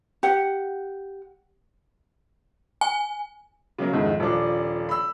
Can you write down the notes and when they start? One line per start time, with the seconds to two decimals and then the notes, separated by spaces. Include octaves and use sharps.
0.23 G4 F#5
2.81 G#5
3.78 C#3 F#3 A#3
3.93 C2 F2 G#2 D#3
4.20 D#1 F3 D4 D5
4.89 B5 E6